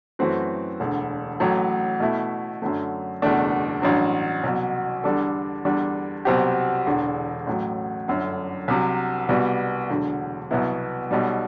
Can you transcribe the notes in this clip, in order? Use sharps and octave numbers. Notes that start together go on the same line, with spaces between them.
F#2 E3 A3 C4 F#4
E1 D2 D3
A1 A2 F#3
B2 A3 E4
F#2 D3 F#3 A3
F#1 E2 B2 A3 D4
A1 G2 F#3
C2 B2 F#3
E2 D3 G3 D4 A4
E2 D3 G3 D4
C2 B2 F#3 C4 G4
E1 E2 D3
A1 A2 F#3
G1 F#2 D3
C2 C3 F#3
C2 B2 G3 B3 F#4
E1 D2 D3 F#3
C2 B2 F#3 B3 E4
B1 B2 G3